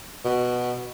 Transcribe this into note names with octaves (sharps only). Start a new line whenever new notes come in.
B2